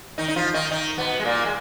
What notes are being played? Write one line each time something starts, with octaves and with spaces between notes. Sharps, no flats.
D#3 D#4
D#4
F3 F4
D#3 D#4
D#3 D#4
B2 B3
G#3
A#2 A#3
G#3